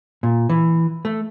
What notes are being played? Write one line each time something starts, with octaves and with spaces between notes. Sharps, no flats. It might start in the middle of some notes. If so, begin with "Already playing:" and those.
A#2
E3
A3